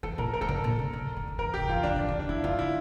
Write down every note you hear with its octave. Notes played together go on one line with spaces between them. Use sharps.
E3 A4
A#2 A#4
A#4
E3 A4
D3 A#4
A#2
C3
D3
D3
E3
E3 A#4
D3 G4
E3 F4
D3 D4
E3
D3
D4
D3 E4
E3 F4
D3 E4